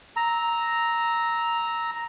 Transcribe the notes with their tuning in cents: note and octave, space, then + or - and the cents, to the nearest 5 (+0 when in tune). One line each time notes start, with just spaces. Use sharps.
A#5 +0 E6 -20